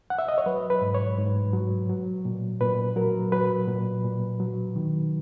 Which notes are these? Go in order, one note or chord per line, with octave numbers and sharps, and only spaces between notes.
F#5
E5
D#5
C#5
F#3 B4
B4
G#2
C#5
G#2
F#3
F#3
A#2
A#2 B4
F#3 A#4
F#3 B4
A#2
A#2
F#3
D#3